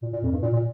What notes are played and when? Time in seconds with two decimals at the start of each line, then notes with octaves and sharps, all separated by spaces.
0.02 A#2
0.13 A#2
0.23 F2
0.32 G2
0.42 A#2
0.53 A#2